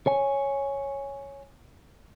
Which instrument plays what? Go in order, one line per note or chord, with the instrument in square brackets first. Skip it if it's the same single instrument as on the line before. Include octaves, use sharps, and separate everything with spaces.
[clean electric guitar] C#5 G#5